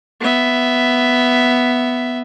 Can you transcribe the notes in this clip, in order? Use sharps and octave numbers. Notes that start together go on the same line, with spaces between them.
B3 E5